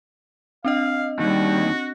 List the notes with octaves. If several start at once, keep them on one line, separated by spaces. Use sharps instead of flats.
C4 D4 D#5 F5
D#2 D#3 G3 F#4